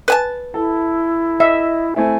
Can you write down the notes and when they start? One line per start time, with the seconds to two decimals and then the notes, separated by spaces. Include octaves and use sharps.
0.08 B4 G#5 A5
0.54 E4 A4
1.40 D#5 E5
1.96 A3 C4 E4 G#5